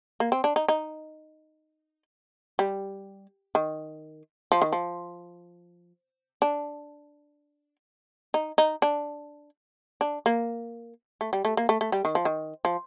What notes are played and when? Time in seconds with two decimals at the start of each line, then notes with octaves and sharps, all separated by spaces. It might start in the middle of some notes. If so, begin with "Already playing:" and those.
0.20 A#3
0.32 C4
0.44 D4
0.56 D#4
0.68 D#4
2.59 G3
3.55 D#3
4.52 F3
4.62 D#3
4.73 F3
6.42 D4
8.34 D#4
8.58 D#4
8.82 D4
10.01 D4
10.26 A#3
11.21 A3
11.33 G3
11.45 A3
11.57 A#3
11.69 A3
11.81 A3
11.92 G3
12.05 D#3
12.15 F3
12.25 D#3
12.65 F3